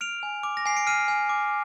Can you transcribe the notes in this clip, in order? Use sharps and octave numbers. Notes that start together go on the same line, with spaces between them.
F6 D7 F7
G#5
D6
A#6
G#5 C7
D7
F6 C7 D#7
G#5
D6